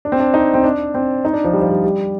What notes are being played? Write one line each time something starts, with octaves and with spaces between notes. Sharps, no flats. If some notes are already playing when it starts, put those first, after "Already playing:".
D4
C4
D4
D#4
C4
D4
C4
D#4
D4
F3
G3
F3
G3
G3